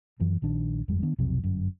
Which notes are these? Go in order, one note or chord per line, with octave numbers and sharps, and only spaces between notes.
F#2 E3 F3
A#1 D#3 D4
G1 F2 G3 G#3
D#3 B3 D4
B1 F2 C3 F#3
G1 F#2